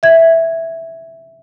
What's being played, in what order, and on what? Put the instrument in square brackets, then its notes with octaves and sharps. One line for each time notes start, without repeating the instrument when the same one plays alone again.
[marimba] E5 G#6